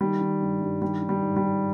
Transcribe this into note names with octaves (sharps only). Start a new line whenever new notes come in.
D#3 G3
D#3
G2
G2
D#3 G3
D#3
G3
G#2
G3
G#2